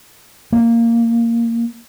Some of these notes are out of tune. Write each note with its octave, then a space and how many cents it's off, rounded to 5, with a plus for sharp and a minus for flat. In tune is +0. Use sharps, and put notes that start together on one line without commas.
A#3 -10